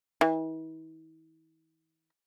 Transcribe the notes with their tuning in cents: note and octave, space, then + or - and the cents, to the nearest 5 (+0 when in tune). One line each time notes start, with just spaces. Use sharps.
E3 -45